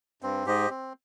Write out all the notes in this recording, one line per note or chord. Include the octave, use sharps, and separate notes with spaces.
G2 C4
G#2 G4 C5 D#5
C4